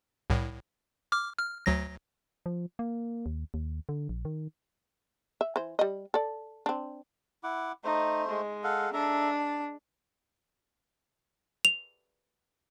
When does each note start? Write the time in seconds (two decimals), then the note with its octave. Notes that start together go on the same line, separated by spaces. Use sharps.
0.30 C2 A2
1.12 D6 F6
1.39 F6
1.66 D2 F#3 A#6
2.46 F3
2.79 A#3
3.26 D#2
3.54 D#2
3.89 D3
4.09 A#1
4.25 D#3
5.41 E5
5.56 E3 C5
5.79 G3 D#5
6.14 A4 D5
6.66 C4 D4
7.44 E4 F#5 D6
7.84 A3 D#4 C5
8.29 G#3
8.64 A4 F5 F#5
8.93 D4 A4 E5 A#5
9.39 A5
11.65 F7